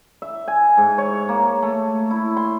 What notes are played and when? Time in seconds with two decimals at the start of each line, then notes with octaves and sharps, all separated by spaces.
0.22 E5
0.48 G#5
0.77 G#2
0.98 C#5
1.29 A#3
1.63 A3
2.11 E4
2.37 C6